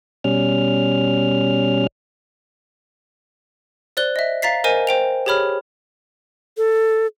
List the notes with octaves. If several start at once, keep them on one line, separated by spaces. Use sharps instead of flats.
B2 G3 C#4 F6
C5 D5 F#6 G7
D#5 E5
F5 A#5 A6 B6 C7
A#4 C5 D#5 G#5 D#7
C5 G5 F7
G4 G#4 C#5 B5 F6
A4